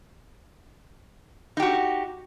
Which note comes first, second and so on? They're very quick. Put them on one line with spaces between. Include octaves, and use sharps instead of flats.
D#4 G4 F#4